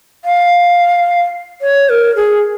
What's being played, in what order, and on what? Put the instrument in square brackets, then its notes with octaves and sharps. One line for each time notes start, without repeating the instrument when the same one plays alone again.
[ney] F5
C#5
A#4
G#4